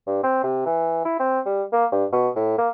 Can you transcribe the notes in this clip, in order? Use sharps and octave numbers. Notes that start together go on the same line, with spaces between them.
G2
C4
C3
E3
E4
C4
G3
A#3
G2
B2
A2
A#3